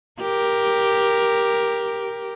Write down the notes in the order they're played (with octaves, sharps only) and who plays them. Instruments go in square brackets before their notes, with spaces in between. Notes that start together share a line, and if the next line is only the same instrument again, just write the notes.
[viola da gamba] G4 A#4